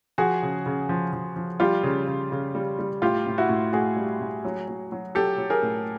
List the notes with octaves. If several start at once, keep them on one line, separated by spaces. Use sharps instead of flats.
F3 F#4 G#4
C#3
C#3
F3
F3
F3
G3 F4 G4
C#3
C#3
C#3
G3
G3
A2 F4 G4
A2
E4 F#4
A2
A2 F#4 G#4
G3
A2
F#3
F#3
F#3
F#3 G4 A4
F#3
G#4 A#4
A2